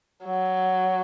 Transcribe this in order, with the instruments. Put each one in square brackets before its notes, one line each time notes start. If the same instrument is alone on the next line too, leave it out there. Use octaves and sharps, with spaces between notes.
[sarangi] F#3